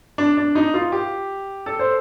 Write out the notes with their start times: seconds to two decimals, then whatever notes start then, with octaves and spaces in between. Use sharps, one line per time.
0.18 D4
0.37 D4
0.55 D#4
0.74 F4
0.92 G4
1.66 A4
1.79 C5